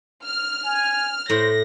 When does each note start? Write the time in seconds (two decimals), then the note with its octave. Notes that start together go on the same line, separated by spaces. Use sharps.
0.24 F6
0.65 G#5
1.30 A2 C5 A#6